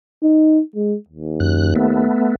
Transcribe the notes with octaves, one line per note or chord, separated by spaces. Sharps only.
D#4
G#3
D#2
F#2 F#6
A3 B3